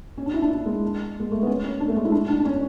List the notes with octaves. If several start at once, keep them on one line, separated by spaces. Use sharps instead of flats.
C#4
D4
E4
D4
E4
G#3
G#3
A3
B3
C#4
C#4
D4
A3
G#3
E4
D4
D4
D4
C#4